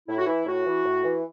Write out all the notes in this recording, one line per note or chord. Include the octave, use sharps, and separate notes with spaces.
A2 E4
F#4
E3 E4
A2 F#4
E3
A2
E3